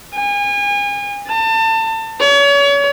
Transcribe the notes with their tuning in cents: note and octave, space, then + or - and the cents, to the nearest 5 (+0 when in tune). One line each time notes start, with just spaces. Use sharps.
G#5 -35
A5 +30
C#5 +35